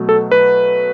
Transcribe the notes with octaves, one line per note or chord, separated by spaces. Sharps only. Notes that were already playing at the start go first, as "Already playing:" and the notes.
Already playing: B2 F#3 A3
A4
B4